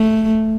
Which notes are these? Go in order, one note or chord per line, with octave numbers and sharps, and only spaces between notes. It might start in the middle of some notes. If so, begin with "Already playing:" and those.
Already playing: A3